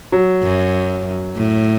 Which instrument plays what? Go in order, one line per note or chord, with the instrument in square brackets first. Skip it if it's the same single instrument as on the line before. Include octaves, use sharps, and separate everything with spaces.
[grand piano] F#3
[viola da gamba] F#2
A2